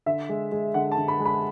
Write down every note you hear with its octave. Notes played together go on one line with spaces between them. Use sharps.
D3 E5
G#3
G#3
D3 F#5
A5
D3
B5
G#3
B5